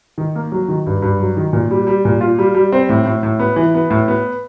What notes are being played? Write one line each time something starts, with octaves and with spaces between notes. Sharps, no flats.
D#3
A#3
F#3
D#3
G2
G2
F#3
D#3
A#2
G3
G3
A#2
F4
G3
G3
C4
A2
A2
A2
B3
E3
B3
A2
B3